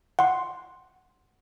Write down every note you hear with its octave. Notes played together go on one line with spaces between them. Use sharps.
F#5 C6